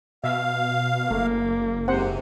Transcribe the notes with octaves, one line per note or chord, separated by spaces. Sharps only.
B2 E5 F5
F#1 A3 A#3
G#2 C3 C4 C5 F#5